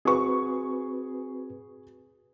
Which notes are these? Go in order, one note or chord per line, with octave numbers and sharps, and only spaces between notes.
C4 F#4 G#4 B4 C#6